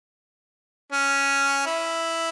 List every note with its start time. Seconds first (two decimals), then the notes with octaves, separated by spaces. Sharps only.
0.92 C#4
1.66 E4